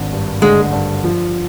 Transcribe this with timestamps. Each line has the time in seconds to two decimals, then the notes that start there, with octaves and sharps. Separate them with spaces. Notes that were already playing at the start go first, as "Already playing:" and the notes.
Already playing: G#1 D4
0.12 G2
0.42 D3 G#3
0.72 G2
1.04 F3